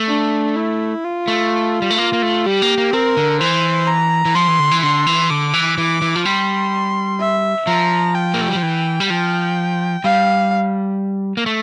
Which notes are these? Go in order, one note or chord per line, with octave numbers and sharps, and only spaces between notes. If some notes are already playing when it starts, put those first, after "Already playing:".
Already playing: A3
D4
E4
F4
A3
G3
A3
A#3 F4
A#3
A3
G3 G4
A#3
A#3
C4 A#4
D3
E3 C5
A#5
E3
F3 C6
E3
D3
E3
D3 C6
E3
D3 D6
E3
E3 D6
E3
F3
G3 C6
E5
F3 A#5
G5
A#3
A3
G3
F3
E3
G3
F3 G5
G3 F5
A#3
A3